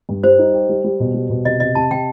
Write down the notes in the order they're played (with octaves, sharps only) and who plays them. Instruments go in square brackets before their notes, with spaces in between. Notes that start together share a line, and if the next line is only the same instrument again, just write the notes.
[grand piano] G2
[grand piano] G3 [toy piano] C5
[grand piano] D#4
G4
G3
G3
B2
G3
B2
[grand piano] C3 [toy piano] D#5
[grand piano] C3 [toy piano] D#5
[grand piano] C3 [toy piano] A5
[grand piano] C3 [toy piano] G5